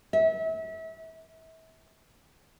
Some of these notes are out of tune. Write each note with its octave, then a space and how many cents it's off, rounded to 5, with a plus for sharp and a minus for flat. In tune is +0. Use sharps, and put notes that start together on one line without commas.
E5 -30